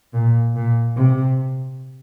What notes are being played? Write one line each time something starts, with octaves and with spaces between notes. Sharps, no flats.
A#2
A#2
C3